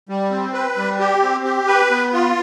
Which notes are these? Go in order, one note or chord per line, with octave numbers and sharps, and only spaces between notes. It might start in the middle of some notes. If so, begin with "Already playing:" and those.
G3
C4
B4
G3
G4
C4
G4
B4
B3
F4